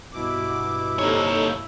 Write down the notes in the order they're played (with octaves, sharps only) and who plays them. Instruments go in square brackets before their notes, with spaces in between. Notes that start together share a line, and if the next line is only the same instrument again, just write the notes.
[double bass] G2 E4 [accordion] B2 D6
[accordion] C3 D#4 A4 [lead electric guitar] A#3 C#5